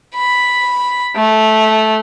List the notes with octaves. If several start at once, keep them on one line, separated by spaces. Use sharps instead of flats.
B5
A3